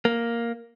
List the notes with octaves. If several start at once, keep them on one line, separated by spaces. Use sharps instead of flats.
A#3